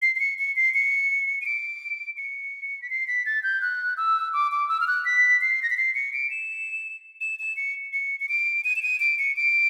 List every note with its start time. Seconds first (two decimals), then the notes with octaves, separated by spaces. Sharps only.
0.02 C7
0.16 C7
0.20 C#7
0.38 C#7
0.56 C7
0.74 C#7
1.41 D#7
1.46 D7
2.17 C#7
2.82 B6
2.90 C7
3.08 B6
3.26 A6
3.43 G6
3.62 F#6
3.97 E6
4.33 D6
4.52 D6
4.69 E6
4.80 F6
4.88 F#6
5.05 B6
5.41 C7
5.63 A#6
5.70 B6
5.77 C7
5.95 C#7
6.13 D7
6.31 E7
7.21 E7
7.39 E7
7.57 C#7
7.93 C#7
8.20 C#7
8.29 D7
8.64 D#7
8.76 E7
8.82 D#7
9.00 D7
9.19 C#7
9.36 D7